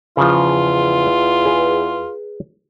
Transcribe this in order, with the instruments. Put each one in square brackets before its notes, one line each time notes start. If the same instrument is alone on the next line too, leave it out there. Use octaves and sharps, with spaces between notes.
[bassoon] E2 [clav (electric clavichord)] C#3 F3 [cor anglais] F4
[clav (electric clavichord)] G#4 B4